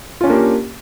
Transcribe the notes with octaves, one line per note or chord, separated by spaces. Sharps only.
A#3 C#4 D4 F4 G4